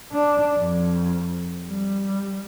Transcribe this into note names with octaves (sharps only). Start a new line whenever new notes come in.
D4
F2
G3